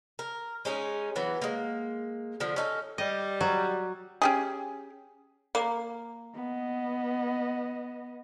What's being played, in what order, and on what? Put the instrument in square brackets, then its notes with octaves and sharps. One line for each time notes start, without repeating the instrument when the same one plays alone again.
[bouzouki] A#4
G#3 C#4 D#4 G#4
E3 F#3 B3
G#3 A#3
D3 F3
C#4 D#4 A4
[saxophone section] G3 [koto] D#5
[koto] F#3
[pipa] C#4 G4 G#4
A#3
[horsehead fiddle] B3 D#5